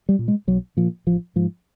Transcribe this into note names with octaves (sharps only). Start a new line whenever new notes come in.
G3
A#2
G#3
B1 F#3
A#2 F3
A1 F3
G#2 F3